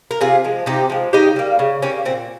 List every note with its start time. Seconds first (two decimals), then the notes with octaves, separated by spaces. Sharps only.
0.11 A#4
0.21 C3 F4 G#4
0.44 F3 G#3
0.66 C3 D#4 G4
0.90 F3 G#3
1.13 C#3 D#4 G4
1.36 G3 A#3
1.59 C#3
1.82 G3 A#3 C#4
2.05 A#2 C4